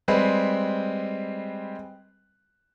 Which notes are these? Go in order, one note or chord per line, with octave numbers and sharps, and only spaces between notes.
G3 G#3 C4 B4